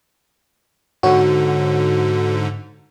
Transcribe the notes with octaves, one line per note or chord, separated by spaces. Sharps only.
G#2 D3 F#4 C#5